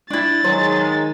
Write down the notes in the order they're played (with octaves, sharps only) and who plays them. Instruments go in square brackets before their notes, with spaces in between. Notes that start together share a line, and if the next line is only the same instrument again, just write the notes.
[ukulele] D4 E4 [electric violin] A6
[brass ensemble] D#3 G#3 [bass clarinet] F#3 [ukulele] C5